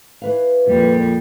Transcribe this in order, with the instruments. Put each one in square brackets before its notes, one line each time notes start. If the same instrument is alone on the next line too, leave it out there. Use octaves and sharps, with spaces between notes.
[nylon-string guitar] E3 B4 F5
[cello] F2 G3 [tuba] A#2